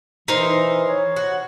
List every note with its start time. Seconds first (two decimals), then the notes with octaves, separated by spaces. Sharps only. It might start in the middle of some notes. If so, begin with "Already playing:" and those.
0.28 E3 D#4 A#4 C5
0.88 C#5
1.16 F#4